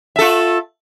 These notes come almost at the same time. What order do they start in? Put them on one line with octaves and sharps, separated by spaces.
E5 A4 F4